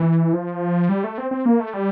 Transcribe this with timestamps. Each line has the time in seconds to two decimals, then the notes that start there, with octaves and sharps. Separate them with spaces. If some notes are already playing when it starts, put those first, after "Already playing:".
Already playing: E3
0.33 F3
0.89 G3
1.04 A3
1.18 C4
1.31 C4
1.46 A#3
1.60 A3
1.74 G3